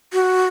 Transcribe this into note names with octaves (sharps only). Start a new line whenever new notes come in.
F#4